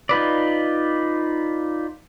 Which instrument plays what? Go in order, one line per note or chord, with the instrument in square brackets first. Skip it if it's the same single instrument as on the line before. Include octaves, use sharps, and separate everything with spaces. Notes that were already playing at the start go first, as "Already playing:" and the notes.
[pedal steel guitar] D#4 F4 B4 D5